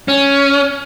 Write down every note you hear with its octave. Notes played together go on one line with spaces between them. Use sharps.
C#4